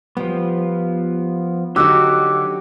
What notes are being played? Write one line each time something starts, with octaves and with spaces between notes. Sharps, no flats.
F3 G3 B3
D3 F#3 D#4 F#4 G4 D6 E6 F#6